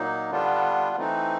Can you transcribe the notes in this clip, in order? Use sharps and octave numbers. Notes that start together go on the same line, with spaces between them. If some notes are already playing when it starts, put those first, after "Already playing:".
Already playing: A#2 F#3 A#3 D#4
D3 G3 B3 D4 F4
E3 A3 C4 D#4